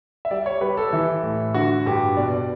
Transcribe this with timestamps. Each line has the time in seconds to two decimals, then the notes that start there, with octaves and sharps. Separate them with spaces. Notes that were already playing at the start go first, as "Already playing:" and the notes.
0.25 E5
0.31 G3 D5
0.46 C#5
0.61 G3 B4
0.77 A4
0.93 E3
1.23 A2
1.54 D3 F#4
1.86 G2 G4
2.17 B2 D5
2.34 D5